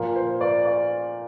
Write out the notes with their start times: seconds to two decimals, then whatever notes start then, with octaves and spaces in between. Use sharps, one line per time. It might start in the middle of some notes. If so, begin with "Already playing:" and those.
Already playing: A#2 F3 A#3 A#4
0.16 C5
0.41 D5
0.65 D5